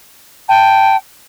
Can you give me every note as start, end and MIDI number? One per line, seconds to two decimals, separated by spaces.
0.49 0.96 79
0.49 0.97 81